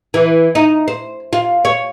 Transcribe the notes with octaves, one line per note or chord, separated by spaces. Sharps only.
E3
D#4
C5
F4
C#5